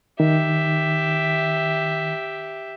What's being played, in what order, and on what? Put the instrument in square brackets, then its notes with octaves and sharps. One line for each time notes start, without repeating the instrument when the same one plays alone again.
[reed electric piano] D#3 [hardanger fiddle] G4 E5